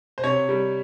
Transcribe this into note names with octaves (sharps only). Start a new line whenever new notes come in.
C5
C3 C#5
G3